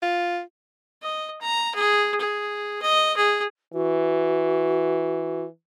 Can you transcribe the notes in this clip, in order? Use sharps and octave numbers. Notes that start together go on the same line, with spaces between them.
F4
D#5
A#5
G#4
G#4
D#5
G#4
E3 F#4